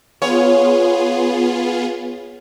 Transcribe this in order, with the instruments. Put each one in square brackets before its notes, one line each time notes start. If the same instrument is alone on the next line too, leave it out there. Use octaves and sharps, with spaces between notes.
[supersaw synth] B3 F4 G#4 [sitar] C#5